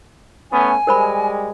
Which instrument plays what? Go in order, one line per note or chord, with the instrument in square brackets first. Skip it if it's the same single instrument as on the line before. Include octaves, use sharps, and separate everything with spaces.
[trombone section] A3 B3 C#4 [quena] G#5
[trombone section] G3 G#3 [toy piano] A#4 C5 B5